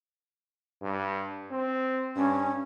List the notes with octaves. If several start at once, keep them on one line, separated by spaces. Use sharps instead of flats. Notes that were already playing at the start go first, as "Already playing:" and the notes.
G2
C4
G2 C#4